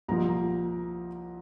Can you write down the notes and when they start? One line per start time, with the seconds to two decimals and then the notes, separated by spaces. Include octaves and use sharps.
0.08 C2 A#2 F3 A#5